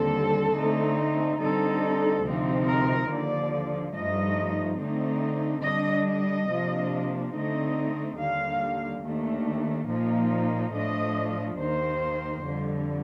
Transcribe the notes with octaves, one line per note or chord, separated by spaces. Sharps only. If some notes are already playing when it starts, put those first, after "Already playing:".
Already playing: D#2 D3 G3 C4 A4
D3 A3 C4 D#4
D3 G3 C4 D#4 A4
D2 C3 F3 C4 D#4
A#4
D#2 D3 F3 D5
G2 F3 A3 D#4 D#5
D3 A3 C4 D#4
D3 G3 D4 D#5
D#5
C3 F3 A#3 D4
D3 A3 C4 D#4 D#5
D#2 D3 G3 F5
D#2 D#3 A3 D4
A#2 F3 A#3 D#4
A2 F3 A3 D4 D#5
D#2 D#3 A#3 C5
F2 D3 G3